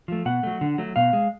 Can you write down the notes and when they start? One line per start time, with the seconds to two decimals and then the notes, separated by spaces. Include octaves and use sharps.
0.08 F3 A3
0.25 B2 F#5
0.43 F#3 A3
0.61 D3
0.78 F#3 A3
0.96 B2 F5
1.13 G#3